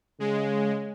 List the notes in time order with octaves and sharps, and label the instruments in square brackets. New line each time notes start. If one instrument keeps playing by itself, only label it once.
[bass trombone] C#3 [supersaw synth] G#3